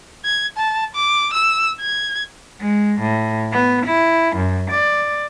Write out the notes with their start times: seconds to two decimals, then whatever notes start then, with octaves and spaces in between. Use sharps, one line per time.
0.25 G#6
0.57 A5
0.95 D6
1.33 E6
1.81 G#6
2.60 G#3
3.00 A2
3.52 B3
3.86 E4
4.36 F#2
4.70 D5